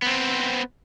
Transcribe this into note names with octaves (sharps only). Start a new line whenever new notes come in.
B3 C4